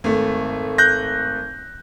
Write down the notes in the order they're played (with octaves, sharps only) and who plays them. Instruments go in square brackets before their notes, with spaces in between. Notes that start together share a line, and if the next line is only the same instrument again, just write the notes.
[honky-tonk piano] G#1 A3
[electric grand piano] F#6 G6 A#6